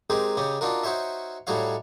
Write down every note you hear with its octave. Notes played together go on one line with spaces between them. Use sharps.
G#3 C4 D#4 G4 G#4 A#4
C#3 C#4 D#4 G4
D4 D#4 F4 F#4 A#4
D#4 F#4 C5 C#5 E5
A2 G3 D#4 F#4 C#5 F5